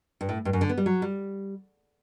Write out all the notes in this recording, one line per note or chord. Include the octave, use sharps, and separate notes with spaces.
G2
A2
G2
F#2
D3
B3
G3
F#3
G3